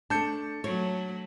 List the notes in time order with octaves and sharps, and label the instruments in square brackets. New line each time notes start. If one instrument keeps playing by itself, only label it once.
[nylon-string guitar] A3 D4 [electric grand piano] A5 G6 C#7
[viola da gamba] F#3 A3 [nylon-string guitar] C#5